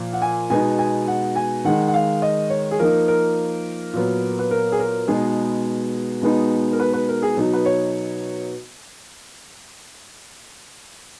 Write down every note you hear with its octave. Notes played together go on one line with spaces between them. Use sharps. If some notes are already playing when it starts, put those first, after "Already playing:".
Already playing: A#2 F3 A#3
F#5
G#5
B2 G#3 B3 D#4 G#5
G#5
F#5
G#5
D#3 G#3 D#4 F#5
F#5
F5
D#5
C#5
G#4
F3 A#3 D#4 A#4
A#4
A#2 F#3 B3
B4
A#4
G#4
A#4
B2 G#3 B3 D#4 G#4
B2 G#3 B3 D#4
A#4
B4
B4
A#4
G#4
B2 F#3 B3 D#4
B4
C#5